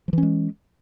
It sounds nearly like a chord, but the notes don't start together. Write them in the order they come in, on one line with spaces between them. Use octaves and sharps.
F3 E3 C#4 G#3